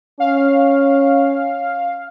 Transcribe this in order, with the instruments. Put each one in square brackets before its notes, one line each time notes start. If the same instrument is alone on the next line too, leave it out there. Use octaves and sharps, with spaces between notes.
[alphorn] C#4 [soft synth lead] F5